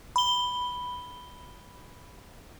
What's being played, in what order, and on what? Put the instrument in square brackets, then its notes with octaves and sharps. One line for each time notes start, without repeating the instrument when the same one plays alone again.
[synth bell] B5 G7